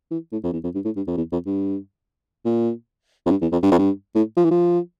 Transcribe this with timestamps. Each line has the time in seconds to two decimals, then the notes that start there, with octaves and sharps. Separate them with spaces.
0.11 E3
0.32 A2
0.43 F2
0.53 E2
0.64 F2
0.74 G2
0.85 A2
0.96 G2
1.07 F2
1.17 E2
1.32 F2
1.46 G2
2.45 A#2
3.26 F2
3.30 G2
3.42 E2
3.52 F2
3.62 G2
3.71 F2
3.79 G2
4.15 A2
4.37 F3
4.45 E3
4.51 F3